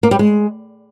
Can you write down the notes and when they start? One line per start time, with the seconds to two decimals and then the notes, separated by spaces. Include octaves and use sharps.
0.03 A#3
0.11 G3
0.19 G#3